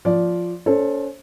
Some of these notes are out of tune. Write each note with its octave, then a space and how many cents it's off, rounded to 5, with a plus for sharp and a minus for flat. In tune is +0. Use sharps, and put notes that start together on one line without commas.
F3 +0 D5 -10
C#4 +35 A4 +0 C5 +30